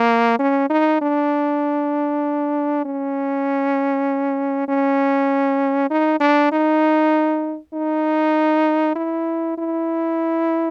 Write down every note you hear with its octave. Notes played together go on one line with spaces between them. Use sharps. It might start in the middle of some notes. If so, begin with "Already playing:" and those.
Already playing: A#3
C#4
D#4
D4
C#4
C#4
D#4
D4
D#4
D#4
E4
E4